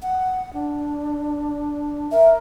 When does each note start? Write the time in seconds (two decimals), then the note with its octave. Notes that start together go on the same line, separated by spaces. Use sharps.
0.02 F#5
0.53 D4
2.12 A#4 E5